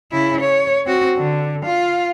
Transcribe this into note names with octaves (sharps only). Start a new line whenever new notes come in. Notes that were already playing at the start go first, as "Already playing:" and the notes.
C#3 E4
C#5
C4 F#4
D3
F4 F5